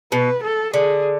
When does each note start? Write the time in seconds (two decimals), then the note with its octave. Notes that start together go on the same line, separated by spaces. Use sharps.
0.12 B2 B4
0.43 A4
0.74 D3 G#4